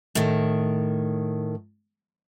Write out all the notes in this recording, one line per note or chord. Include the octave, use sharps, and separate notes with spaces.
A2 D#3